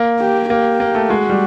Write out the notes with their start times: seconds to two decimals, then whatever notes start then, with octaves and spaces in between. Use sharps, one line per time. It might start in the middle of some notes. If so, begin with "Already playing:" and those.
Already playing: A#3
0.19 G4
0.50 A#3 G4
0.80 A#3
0.95 A3
1.10 G#3 F#4
1.29 G3